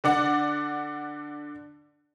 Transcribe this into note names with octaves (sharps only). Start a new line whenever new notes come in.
D3 D5 F#5